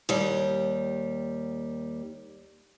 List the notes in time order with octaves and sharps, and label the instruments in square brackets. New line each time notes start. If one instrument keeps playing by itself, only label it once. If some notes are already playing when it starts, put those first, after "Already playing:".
[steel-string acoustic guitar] D#2 G3